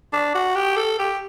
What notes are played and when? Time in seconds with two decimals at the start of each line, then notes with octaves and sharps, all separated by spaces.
0.13 D4
0.34 F#4
0.55 G4
0.76 A4
0.99 G4